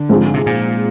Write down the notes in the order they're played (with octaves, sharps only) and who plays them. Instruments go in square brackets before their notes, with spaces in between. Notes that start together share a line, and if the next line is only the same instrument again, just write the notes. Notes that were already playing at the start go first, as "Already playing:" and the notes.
Already playing: [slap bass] D3
[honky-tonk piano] G#2 F3 C4 F4 G#4
[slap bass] C3
A#2